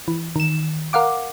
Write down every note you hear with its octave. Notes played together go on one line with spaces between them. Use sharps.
E3
D#3 E7
A#4 F5 F#5 D6